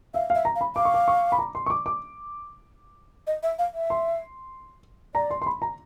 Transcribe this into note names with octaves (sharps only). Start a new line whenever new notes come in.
E5 F5
E5 F5
A#5
F5
B5
F5 D6
C#6
D6
C#6
B5
A#5
C6
C#6
D6
D6
D#5
E5
F5
E5
C6
D5 A#5
C6
C6
B5
A#5